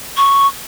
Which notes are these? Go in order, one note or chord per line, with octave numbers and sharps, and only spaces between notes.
C#6